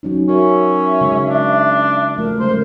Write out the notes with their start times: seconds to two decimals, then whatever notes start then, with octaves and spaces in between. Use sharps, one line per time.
0.03 F#3 C#4 D#4
0.29 C#4 F#4 A#4 C#5 E5
1.01 C#3 G#3
1.27 D4
2.18 F3 A3 A#4
2.40 C#3 G3 G#3 C5